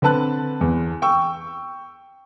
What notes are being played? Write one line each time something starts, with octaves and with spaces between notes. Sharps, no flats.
D3 C4 B4 A5 F#6
E2
G5 C#6 E6